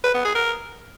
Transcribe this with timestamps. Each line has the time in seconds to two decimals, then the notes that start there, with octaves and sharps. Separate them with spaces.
0.04 B4
0.14 B3
0.25 G#4
0.35 A#4